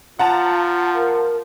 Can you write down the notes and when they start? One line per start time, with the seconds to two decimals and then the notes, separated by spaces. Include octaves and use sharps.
0.19 F3 F4 F#5 A5 A#5
0.95 A#4